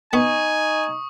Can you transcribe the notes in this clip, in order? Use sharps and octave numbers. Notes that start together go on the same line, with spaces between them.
B3 D#4 G#5 C#6 D#6